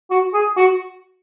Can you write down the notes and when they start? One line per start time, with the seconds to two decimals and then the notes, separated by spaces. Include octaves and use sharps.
0.10 F#4
0.34 G#4
0.57 F#4